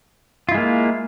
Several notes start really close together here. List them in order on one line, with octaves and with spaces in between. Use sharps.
F4 E4 G#3 A#3